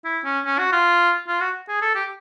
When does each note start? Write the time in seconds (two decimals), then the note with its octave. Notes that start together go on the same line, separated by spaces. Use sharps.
0.05 E4
0.25 C#4
0.46 C#4
0.59 F#4
0.73 F4
1.28 F4
1.41 F#4
1.68 G#4
1.82 A4
1.95 G4